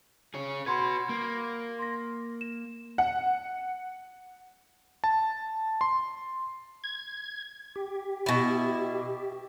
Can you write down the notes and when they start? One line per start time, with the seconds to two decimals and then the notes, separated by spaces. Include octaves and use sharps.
0.34 G#4 C#5
0.66 F#4 B4 B5 C6 G#6
1.09 A#3
1.79 C6 A#6
2.41 E7
2.98 F#5
5.04 A5
5.81 C6
6.84 G#6
7.76 G4
8.26 B2 E4